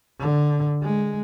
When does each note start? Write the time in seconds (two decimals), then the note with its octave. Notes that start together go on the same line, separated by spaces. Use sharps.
0.19 D3
0.83 G#3